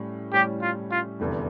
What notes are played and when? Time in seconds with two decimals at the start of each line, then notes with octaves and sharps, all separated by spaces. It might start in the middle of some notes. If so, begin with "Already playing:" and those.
Already playing: A2 G3 C#4
0.33 A2 G3 C#4 G4
0.62 F4
0.91 F4
1.20 F1 E2 D3 G3